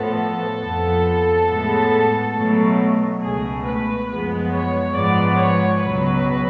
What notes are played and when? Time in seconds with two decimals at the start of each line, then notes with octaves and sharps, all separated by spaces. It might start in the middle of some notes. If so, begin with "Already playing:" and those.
Already playing: A2 F3 B3 A4
0.60 F2 F3 B3
1.47 A2 G#3 B3
2.34 B2 F#3 A3
3.21 C#2 B2 A3 G#4
3.64 B4
4.08 F#2 F3 G#3 B3 B4
4.52 C#5
4.95 G#2 F3 G#3 B3 D5
5.39 C#5
5.82 C#2 B2 F#3 B4